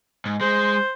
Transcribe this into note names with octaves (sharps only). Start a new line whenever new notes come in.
G#2
G#3 C5